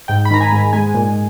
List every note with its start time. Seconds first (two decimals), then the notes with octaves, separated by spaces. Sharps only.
0.08 G#2 G5
0.25 B5
0.31 D#3 A#5
0.41 G#5
0.52 G#2
0.73 G#3 G#5
0.94 A#2